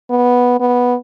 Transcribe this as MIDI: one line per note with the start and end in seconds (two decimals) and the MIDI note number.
0.10 0.58 59
0.60 0.95 59